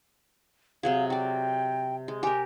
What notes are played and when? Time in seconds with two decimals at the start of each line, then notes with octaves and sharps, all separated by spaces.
0.83 C3 F#3 G#4 F5
1.10 F#4 D5 G5
2.08 G#3
2.23 G4 A#4 G#5